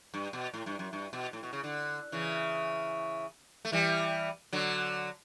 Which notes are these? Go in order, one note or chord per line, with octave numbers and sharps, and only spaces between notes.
G2
B2
A2
G2
F#2
G2
B2
A2
B2
C#3
D3
C#3 E3
A3
E3 G3
D3 F#3